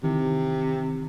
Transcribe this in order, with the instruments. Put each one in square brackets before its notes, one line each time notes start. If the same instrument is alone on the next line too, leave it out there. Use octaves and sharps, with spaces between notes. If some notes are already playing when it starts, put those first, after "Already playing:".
[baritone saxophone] C3 [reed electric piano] D#3 E3